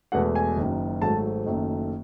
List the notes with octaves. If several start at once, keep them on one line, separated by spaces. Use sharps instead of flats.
E1 E2 B2 A3 F#5
G#5
F#1 F#2 D#3
G#1 G#2 F#3 A3 A5
F#1 F#2 D#3 A3